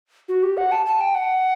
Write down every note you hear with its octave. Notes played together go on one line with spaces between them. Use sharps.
F#4
G4
F#5
A5
A5
G5
F#5